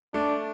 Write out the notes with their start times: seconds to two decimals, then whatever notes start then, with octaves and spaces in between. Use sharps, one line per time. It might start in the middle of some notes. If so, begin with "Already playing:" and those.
0.14 A3 D4